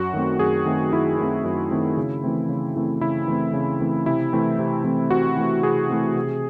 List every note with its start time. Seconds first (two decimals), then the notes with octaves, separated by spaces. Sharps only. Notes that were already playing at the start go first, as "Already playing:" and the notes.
Already playing: F#2 F#4
0.13 D#3 A3 C4
0.39 F#2 G#4
0.66 D#3 A3 C4
0.92 F#2 E4
1.18 D#3 A3 C4
1.44 F#2
1.71 D#3 A3 C4
1.97 C#3
2.24 E3 A3 C4
2.49 C#3
2.76 E3 A3 C4
3.01 C#3 E4
3.27 E3 A3 C4
3.53 C#3
3.80 E3 A3 C4
4.06 C3 E4
4.33 E3 A3 C4
4.59 C3
4.84 E3 A3 C4
5.11 C3 F#4
5.37 E3 A3 C4
5.63 C3 G#4
5.89 E3 A3 C4
6.16 C3